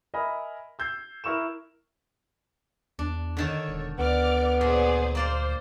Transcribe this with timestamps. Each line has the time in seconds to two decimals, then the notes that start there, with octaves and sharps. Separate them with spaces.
0.14 A#4 D#5 E5 G#5 B5
0.79 E6 G6 G#6 C7
1.24 E4 A#4 C#6 E6 E7
2.99 E2 D4
3.37 D3 D#3 A4 C#5
3.69 E1
3.98 D2 B3 D5 D6 F6
4.61 A#2 G#4 C5 D5
5.15 A#3 C5 D5 F5